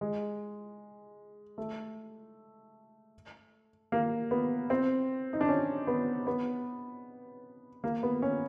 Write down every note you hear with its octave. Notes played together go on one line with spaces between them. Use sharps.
G#3
A3
A#3
B3
C4
D#4
D4
C#4
B3
B3
A#3
B3
C#4